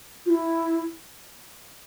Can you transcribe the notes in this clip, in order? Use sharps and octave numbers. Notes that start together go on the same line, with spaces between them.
F4
E4